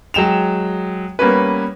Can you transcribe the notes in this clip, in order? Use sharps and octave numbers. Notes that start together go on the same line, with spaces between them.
F#3 G#3 G5 E7 F7
G3 A#3 B3 C#4 B4